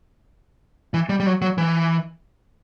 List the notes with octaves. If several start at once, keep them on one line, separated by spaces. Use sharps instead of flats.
E3
G3
G3
F#3
F#3
E3